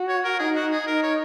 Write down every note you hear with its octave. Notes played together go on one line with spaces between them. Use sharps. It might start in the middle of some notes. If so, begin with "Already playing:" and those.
Already playing: F#4
C#5
A#4
D#4 G#4
F#4
G#4
D#4 A#4
C#5